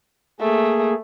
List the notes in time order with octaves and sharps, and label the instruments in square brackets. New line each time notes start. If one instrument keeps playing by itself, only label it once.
[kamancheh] A3 [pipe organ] A#3 G#4